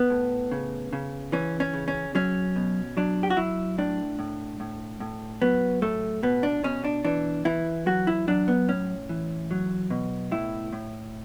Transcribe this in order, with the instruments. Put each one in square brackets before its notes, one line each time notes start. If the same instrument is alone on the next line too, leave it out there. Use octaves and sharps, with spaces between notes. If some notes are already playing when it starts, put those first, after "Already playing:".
Already playing: [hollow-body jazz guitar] B3
A2
C#3
C#3
E3 C#4
C#4
C#3
C#4
F#3 C#4
B2
F#3 D4
G4
F#4
F#3 E4
A2 D4
A2
A2
A2
F#3 B3
A2 A3
B2 B3
D4
B2 C#4
D4
E3 D4
E3 E4
F#3 F#4
E4
F#3 D4
B3
A2 C#4
E3
F#3
B2
A2 E4
A2